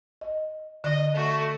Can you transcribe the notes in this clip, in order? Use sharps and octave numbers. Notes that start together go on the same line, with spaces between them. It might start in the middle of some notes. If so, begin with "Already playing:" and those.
D#5
D3 D#5
A3 F#4